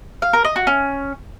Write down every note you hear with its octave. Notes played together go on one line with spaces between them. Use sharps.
F5
A#4
D#5
F#4
C#4